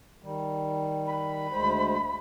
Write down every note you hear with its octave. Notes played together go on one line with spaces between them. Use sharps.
D#3 G3
B5
D2 G#3 C5